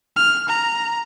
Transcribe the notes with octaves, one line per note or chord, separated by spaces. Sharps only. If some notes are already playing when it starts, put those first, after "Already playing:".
F6
A#5